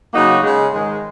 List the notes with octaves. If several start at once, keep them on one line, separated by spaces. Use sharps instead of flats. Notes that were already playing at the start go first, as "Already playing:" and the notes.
C#3 F#3 A#3 D#4 F#4
C#3 G#3
G#2 D#3 G#3